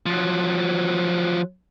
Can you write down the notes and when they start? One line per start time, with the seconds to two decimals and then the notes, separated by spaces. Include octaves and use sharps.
0.06 F3 F#3